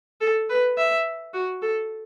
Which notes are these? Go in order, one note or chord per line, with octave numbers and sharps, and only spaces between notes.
A4
B4
E5
F#4
A4